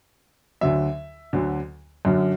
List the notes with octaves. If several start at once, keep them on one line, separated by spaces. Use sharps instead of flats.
D2 D3 F#3 E5
D2 D3 F#3
F#2 D3 F#3